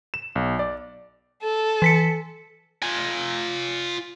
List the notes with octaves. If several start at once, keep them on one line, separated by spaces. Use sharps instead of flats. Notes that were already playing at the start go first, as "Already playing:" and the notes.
E7
B1
D5
A4
E3 B6 C#7
F4 G#5